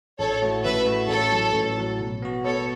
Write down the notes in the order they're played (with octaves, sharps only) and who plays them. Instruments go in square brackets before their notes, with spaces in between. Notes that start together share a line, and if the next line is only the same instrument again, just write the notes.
[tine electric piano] A1 [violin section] A4 C#5
[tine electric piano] A2 A3 F#4
[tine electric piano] A1 [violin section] B4 E5
[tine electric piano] A2 A3 F#4
[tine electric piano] A1 [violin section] A4 C#5
[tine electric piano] A2 F#3
A1
A2 F#3
B2
B3 F#4
[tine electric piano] B2 [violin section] A4 C#5